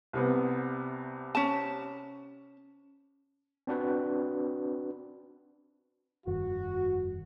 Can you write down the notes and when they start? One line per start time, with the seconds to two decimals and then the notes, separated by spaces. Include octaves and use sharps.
0.13 C2 C3 B3
1.35 C#4 A5
3.67 C4 D4 F#4 B4
6.27 F1 G2 D#3 F#4